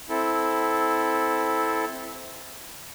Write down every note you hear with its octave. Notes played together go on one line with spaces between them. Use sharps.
C4 E4 A4